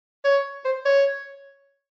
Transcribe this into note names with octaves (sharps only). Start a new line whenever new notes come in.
C#5
C5
C#5